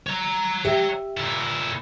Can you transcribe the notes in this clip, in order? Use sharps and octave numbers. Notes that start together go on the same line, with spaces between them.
C#5 A#5
G4 E5
A#2 E4